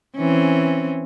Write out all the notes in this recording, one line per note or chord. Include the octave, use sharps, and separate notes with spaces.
E3 C4 C#4